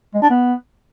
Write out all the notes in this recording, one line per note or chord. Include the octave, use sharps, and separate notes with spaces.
G#3
D4
B3